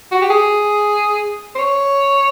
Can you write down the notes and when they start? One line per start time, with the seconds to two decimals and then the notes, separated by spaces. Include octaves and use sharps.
0.12 F#4
0.22 G4
0.30 G#4
1.55 C5
1.59 C#5